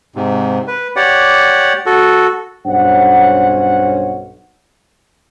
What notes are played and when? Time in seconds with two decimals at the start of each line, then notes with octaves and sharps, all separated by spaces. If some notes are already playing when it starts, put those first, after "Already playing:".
0.15 G#2 C3
0.67 B4
0.96 G4 C#5 D5 F#5
1.86 F#4 A4
2.66 B1 G2 C#4 C5 F#5